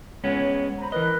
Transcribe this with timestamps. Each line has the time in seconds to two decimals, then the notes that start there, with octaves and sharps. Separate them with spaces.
0.24 G#3 B3 C#4 C#5
0.78 C5 A#5 B5
0.92 E3 A#4 B4 D#5 F#6